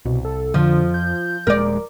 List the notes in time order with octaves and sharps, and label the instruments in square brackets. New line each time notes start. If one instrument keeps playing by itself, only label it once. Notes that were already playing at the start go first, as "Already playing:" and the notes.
[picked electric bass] C2 [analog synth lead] B2
[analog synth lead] A4
[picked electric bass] F2 [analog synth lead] D3 [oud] F3
[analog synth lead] G6
[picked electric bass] D#1 A#2 G#3 [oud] A#4 D5